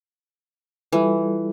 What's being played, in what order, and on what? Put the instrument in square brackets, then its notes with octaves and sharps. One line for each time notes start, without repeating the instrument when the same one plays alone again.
[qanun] E3 [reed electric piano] G3 F4 A4